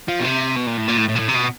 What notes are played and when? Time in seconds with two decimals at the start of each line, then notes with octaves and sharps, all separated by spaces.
0.08 F3
0.19 B2
0.24 C3
0.56 B2
0.66 A#2
0.77 A2
0.87 A#2
0.97 A2
1.08 A2
1.15 A#2
1.19 A2
1.28 C3
1.35 B2